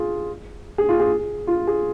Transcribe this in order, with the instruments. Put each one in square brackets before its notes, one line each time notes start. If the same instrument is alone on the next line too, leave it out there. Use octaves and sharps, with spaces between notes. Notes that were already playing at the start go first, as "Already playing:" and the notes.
Already playing: [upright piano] F4 G#4
G#4
F4
G#4
F4
G#4